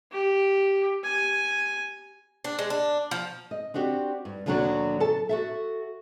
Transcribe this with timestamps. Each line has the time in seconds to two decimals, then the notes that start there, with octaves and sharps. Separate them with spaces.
0.12 G4
1.04 G#5
2.44 D4
2.59 G#3
2.70 D4
3.11 F3
3.51 D#5
3.74 C4 D4 F#4 G4
4.25 G2
4.46 D#2 B2 D3 F#3 D4 F#4
5.00 A4 A5
5.29 F#4 A4 E5